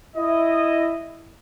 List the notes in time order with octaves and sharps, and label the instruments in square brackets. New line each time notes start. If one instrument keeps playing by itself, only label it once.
[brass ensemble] E4 D#5